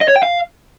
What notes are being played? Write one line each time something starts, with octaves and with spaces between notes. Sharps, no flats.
D#5
C#5
G5
F5